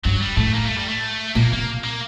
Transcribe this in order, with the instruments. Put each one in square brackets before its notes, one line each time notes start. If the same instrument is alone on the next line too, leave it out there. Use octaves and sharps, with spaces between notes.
[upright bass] G2 [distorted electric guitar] F#3
[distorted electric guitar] G3
[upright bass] A2 [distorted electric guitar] A3
[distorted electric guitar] A#3
A3
G3
A3
[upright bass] A#2 [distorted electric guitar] A#3
[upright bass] C3 [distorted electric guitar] A#3
[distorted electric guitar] A#3